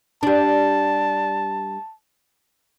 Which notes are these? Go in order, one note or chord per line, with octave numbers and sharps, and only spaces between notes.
G3 D4 A5